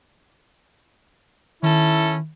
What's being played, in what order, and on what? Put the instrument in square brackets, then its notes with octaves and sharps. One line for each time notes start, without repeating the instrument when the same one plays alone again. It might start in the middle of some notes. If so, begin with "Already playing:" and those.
[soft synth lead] D#3 [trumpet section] C#4 A4 [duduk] E4